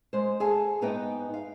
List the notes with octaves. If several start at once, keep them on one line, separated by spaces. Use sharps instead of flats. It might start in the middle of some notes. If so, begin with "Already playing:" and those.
G#3 C5
G#4 A4 F5 G#5 A5
G#2 B3 D#4 B4 D#5 G5
F5